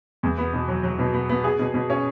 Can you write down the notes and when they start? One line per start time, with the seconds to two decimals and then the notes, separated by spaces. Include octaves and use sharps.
0.23 E2
0.38 B3
0.54 B2
0.68 F#3
0.83 F#3
0.99 B2
1.14 B3
1.29 B3
1.44 G#4
1.59 B2
1.74 B2
1.90 C#4